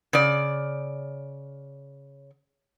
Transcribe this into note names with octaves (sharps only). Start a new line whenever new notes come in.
C#3 D5